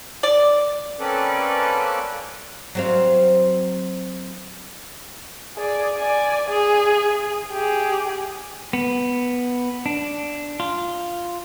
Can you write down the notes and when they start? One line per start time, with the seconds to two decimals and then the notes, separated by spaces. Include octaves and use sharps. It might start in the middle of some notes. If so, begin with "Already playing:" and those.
0.23 D5
0.99 A#3 C4 C#4 A4 B4 D5
2.75 F#3 C4 F5
5.57 G#4 D5
5.97 D5 G#5
6.49 G#4
7.52 G4 G#4
8.73 B3
9.86 D4
10.60 F4